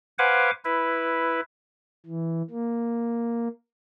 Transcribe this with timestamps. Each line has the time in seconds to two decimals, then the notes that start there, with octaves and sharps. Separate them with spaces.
0.19 B4 C5 F5 F#5 G#5 D6
0.65 E4 B4
2.06 E3
2.51 A#3